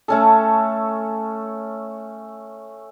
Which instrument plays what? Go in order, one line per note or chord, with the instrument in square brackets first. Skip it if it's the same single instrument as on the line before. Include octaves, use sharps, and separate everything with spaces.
[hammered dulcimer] A3 C#4 A4